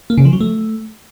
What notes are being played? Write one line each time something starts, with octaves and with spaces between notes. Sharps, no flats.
A#3
C#3
F3
F#3
A3